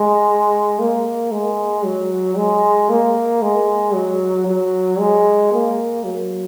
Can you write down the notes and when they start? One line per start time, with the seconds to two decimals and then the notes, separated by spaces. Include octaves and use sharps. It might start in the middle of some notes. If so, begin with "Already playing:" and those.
Already playing: G#3
0.79 A#3
1.32 G#3
1.85 F#3
2.37 G#3
2.89 A#3
3.42 G#3
3.94 F#3
4.47 F#3
4.99 G#3
5.52 A#3
6.04 F#3